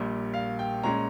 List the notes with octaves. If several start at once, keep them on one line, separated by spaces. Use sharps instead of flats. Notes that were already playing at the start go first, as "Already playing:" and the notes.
Already playing: A#1 A#2 G3
F5
G5
A#2 G#3 C#4 A#5